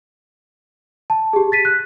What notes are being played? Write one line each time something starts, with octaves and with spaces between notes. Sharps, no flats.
A5
G4 G#4
A6 B6 D#7
F#6